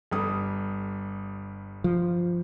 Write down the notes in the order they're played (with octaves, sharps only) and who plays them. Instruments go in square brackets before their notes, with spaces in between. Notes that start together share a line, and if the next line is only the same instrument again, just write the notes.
[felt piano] G1 G3 D#6
[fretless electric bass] F3